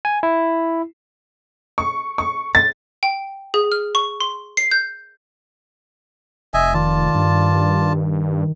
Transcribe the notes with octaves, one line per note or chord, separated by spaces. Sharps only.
G#5
E4
C#6
C#6
A6
G5
G#4
F6
C#6
C6
C7
G6
F1 D#5 E5 G#5
D#3 F4 D5 A5
G2